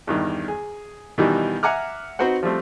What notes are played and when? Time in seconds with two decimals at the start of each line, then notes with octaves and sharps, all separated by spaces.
0.07 E2 G2 D#3
0.48 G#4
1.18 B2 D#3 E3 G3
1.63 E5 F#5 G#5 A#5 D6 F6
2.19 C4 D#4 F#4 B4 C5 F#5
2.43 F3 G3 A3 C4